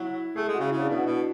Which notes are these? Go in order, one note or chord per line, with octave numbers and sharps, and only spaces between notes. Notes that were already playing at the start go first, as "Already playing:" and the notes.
Already playing: F#3 E4
A3 G#4
G#3
F#4
C#3
C#3 E4
D4
B2 E4
F#4
B2